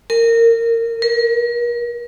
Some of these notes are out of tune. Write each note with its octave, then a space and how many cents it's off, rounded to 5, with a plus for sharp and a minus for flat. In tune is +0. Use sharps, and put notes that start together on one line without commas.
A#4 -20
A#4 +40